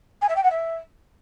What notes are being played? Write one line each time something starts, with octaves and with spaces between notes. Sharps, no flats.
G#5
E5
G5
F#5
E5